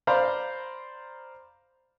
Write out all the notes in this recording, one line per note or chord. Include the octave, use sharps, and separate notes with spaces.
C5 D5 F5 A#5 B5